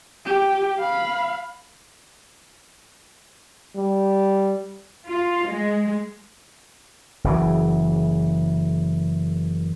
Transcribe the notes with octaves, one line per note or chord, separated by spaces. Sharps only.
G4
F5 B5
G3
F4
G#3
F#1 C#3 E3